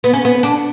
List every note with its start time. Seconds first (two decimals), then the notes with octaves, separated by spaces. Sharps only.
0.04 B3
0.13 C#4
0.25 B3
0.43 D4